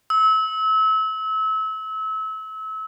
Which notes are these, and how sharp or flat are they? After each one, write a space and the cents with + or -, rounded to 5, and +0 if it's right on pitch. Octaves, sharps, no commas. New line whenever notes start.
E6 -30